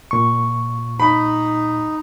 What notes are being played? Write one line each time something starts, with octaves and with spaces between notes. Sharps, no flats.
A#2 C#6
D#4 B5